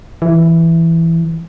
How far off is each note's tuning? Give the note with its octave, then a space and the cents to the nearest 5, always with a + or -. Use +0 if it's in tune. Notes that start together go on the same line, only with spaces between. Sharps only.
E3 +5